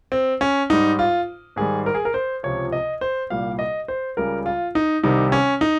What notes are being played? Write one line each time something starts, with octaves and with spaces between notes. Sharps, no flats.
C4
C#4
G#2 G3 D#4
F4
G#2 D#3 G3 G#4
A#4
G#4
A#4
C5
C#2 C3 F3 C#5
D#5
C5
C2 A#2 G3 F5
D#5
C5
C#2 C#3 G3 A#4
F4
D#4
C2 C3 D#3 G3 D#4
C#4
D#4